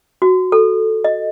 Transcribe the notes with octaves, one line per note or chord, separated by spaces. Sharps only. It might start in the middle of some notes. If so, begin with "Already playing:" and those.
F#4
A4
D#5